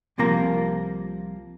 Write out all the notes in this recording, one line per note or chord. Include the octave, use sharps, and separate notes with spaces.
C2 C3 F3 A#3 A#5